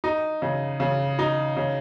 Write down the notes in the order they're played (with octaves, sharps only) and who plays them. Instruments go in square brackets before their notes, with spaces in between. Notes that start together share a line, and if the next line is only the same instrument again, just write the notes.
[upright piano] D#4
C#3
C#3
D#4
C#3